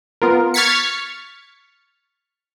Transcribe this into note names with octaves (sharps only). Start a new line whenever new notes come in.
B3 F4 A#4
C#6 F6 G#6 A6 B6 C#7